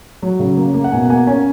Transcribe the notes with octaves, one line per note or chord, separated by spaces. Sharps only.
F#3
C#3
A#3
A#3
F#5
B2 G#5
F#5
A#3 G#5
C#4 G#5